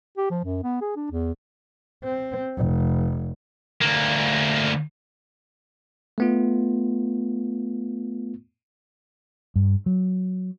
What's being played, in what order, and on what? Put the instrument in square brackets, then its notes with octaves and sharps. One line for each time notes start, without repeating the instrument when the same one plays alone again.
[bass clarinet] G4
F3
F#2
B3
G#4
D4
E2
[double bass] C4
F1
[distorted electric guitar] D2 A#3
[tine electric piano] A3 B3 F4
[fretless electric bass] G2
F#3